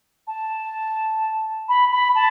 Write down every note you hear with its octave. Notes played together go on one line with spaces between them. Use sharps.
A5
B5
B5
A5